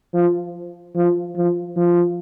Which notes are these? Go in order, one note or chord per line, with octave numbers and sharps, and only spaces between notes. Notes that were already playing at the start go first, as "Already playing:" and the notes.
F3
F3
F3
F3